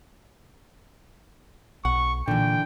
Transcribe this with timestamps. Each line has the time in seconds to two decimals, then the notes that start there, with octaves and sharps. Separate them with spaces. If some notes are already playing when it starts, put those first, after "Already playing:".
1.85 B1 F#5 C#6
2.28 A#2 D3 E3 G5